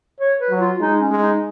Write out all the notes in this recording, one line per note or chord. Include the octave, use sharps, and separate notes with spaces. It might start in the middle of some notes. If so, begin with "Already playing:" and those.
C#5
B4
F#3
F4
G#3 D#4
C#4
G#3
D#4